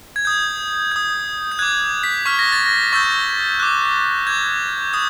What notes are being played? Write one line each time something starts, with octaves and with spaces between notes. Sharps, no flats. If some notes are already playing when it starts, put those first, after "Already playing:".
G#6
D#6 G6
D#6 G6
G6
D6 F#6 G#6
B6
C#6 F6 B6
A#6
A6
A#6
C#6 E6 G6 A6
D6 F#6
D6 G6 G#6
D#6 G6